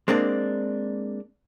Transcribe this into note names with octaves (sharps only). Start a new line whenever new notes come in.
G#3 A#3 C4 D4